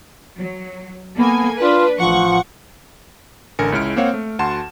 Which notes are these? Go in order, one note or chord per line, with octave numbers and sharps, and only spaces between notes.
F#3
A#3 B3 A4 G#5
D4 F4 B4
A1 F3 F#5 C#6
A1 D3 A#4 G#5 C#7
C#2 G#3 C#4 E4 F6 D7
A#3 C4 C5 C#5 F5 F#5
A3
D2 F#4 F#5 A5 C6 E7